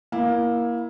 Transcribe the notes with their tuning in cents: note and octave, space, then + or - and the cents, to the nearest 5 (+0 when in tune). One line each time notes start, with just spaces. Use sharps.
A#3 +20 E4 +0